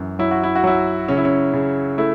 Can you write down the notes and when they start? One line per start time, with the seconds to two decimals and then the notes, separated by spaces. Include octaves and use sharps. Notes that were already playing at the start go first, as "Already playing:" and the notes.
Already playing: F#2 E3
0.19 F#3 E4
0.31 F#4
0.43 E4
0.55 F#4
0.64 F#3 E4
1.08 C#3 C#4
1.17 E4
1.25 C#4
1.54 C#3
1.98 A3 E4